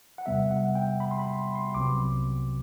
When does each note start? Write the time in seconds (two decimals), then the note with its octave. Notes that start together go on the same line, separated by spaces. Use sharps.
0.18 F#5
0.26 E2 C3 G3 B3 E5
0.51 F#5
0.75 G5
1.00 B5
1.11 C6
1.19 B5
1.55 C6
1.75 C2 C3 F#3 B3 D6